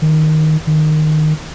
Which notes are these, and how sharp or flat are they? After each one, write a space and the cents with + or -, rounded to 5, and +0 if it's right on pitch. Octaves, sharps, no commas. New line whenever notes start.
D#3 +0
D#3 -15